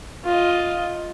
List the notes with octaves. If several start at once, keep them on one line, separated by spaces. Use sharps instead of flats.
F4 D#5